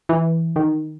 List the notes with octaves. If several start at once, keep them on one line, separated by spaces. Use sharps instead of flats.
E3
D#3